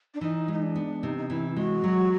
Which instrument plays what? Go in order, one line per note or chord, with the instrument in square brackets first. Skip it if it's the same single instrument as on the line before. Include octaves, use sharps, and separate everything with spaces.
[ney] D4
[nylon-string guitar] E3 [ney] D#4
[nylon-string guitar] G#3 [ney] D#4
[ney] D4
[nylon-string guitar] B3
[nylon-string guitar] C3 [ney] D#4
[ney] D#4
[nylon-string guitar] E3 [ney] E4
[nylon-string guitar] G#3 [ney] F#4
[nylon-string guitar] F#3